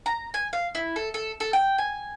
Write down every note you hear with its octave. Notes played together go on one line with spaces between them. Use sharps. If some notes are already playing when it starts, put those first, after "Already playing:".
A#5
G#5
F5
E4
A4
A4
A4
G5
G#5